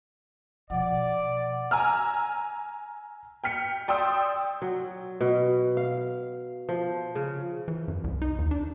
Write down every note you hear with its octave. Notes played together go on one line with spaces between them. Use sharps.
B2 F3 D5 F#5
G#5 A#5 E6 F6
G5 F6 B6 C#7
D5 G5 C6 D#6 E6
F#3
B2
F5
F3
C#3
E3
F#2
C2
D#4
D#2
D4